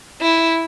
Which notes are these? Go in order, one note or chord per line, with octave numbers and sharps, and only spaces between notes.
E4